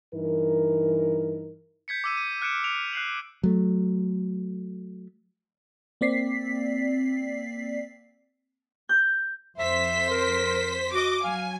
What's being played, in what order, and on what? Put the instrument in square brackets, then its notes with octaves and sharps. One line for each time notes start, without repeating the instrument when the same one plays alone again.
[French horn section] G2 E3 D#4 A#4
[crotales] G6 G#6 B6 C#7
D6 E6 D#7
D#7
F6 F#6 G#6 C#7 D7 E7
F6 D7 F7
F#6 C7 F#7
[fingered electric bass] F#3 A3
[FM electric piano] A#3 C4 D5 B6 C7
[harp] G6
[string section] F2 C5 B6 [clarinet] E5
[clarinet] A#4
[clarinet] F#4 [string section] D#5 D6
[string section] F#3 G#5 [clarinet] F5